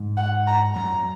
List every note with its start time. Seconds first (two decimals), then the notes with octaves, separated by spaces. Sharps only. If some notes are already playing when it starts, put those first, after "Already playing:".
Already playing: G#2
0.17 F#5
0.47 A#5
0.75 F#2 A#5